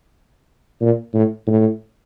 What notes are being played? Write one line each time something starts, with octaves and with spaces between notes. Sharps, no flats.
A#2
A2
A2